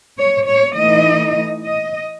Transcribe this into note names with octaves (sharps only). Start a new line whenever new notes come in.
C#5
C#5
E3 A3 D#4 D#5
D#5